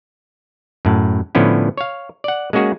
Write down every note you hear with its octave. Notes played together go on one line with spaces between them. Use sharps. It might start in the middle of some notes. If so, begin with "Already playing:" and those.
F#2 A2
A2 D3 F3 B3 C#4 E4
C#5 F5
D5 F#5
G#3 A#3 C#4 F#4 G#4